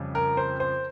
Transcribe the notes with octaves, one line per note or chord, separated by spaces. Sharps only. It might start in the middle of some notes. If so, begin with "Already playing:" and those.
Already playing: F2 C#3 G3
A#4
C5
C5